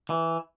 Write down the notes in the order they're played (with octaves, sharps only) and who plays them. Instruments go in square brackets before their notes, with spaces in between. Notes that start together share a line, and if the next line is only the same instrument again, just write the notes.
[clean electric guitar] E3